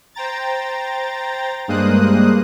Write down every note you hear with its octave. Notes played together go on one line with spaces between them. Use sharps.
C5 G5 A#5 A6
G2 G#3 A#3 C5 D#6 F#6